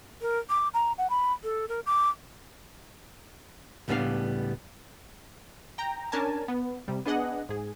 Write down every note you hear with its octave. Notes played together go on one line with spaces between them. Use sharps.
A#4
D6
A#5
F#5
B5
A4
A#4
D6
C#2 A2 G3 B3 D4 F5
G5 A#5
C#4 D4 A#4 G#5 A5
B3
C3 G3
B3 D4 G#4 D#5 F#5
G#2 G#4